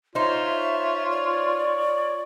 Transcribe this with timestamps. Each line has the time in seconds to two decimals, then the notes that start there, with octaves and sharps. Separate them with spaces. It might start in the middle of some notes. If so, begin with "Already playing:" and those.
0.15 D#4 F4 C5 C#5 E5
1.10 D5